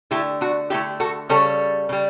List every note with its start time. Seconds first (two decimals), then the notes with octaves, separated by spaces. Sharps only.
0.11 D3 A3 E4 G4
0.41 D4 F#4
0.70 D3 A3 E4 G4
1.00 F#4 A4
1.29 C#3 G3 A4 C#5
1.89 C#3 G3